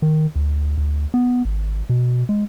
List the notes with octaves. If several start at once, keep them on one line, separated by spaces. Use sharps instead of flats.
D#3
D2
D2
B3
G#1
B2
G#3